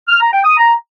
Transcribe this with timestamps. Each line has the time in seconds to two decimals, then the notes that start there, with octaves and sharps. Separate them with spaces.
0.09 F6
0.20 A#5
0.32 G5
0.44 D#6
0.56 A#5